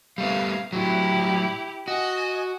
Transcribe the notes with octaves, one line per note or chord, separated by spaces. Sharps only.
G3 A3 B3 F5 G#6
A2 F#3 E4 G4
F#4 D#5 G#5